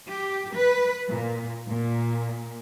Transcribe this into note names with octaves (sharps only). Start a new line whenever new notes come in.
G4
B4
A#2
A#2